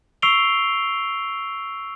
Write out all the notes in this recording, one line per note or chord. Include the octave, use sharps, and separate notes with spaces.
C#6 E6 C7 D7 F7 G7